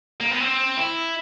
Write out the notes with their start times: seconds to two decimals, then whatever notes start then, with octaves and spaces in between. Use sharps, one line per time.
0.20 A#3
0.31 B3
0.40 C4
0.77 E4